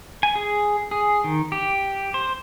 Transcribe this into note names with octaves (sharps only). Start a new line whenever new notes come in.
G#5
G#4
G#4
D#3
G4
C5